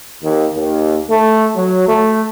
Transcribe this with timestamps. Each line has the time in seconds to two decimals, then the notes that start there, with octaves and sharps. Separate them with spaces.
0.22 D#2
0.55 D#2
1.08 A3
1.56 F#3
1.88 A3